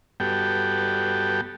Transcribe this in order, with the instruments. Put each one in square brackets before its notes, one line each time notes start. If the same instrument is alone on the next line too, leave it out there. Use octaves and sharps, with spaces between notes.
[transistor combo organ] G2 B3 F#4 G4 A4 G5